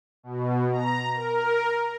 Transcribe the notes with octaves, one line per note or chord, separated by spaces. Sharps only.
B2
A#5
A#4